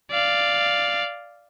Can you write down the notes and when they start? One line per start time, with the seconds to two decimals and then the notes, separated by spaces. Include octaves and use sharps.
0.11 D5 F5